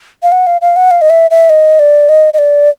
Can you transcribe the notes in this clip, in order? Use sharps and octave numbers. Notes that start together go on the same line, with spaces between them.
F5
F#5
F5
F5
F#5
F5
D#5
E5
E5
D#5
D5
D#5
D#5
D5